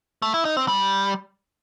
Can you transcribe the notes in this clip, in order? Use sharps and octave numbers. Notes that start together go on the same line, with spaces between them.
A3
E4
D#4
C4
G3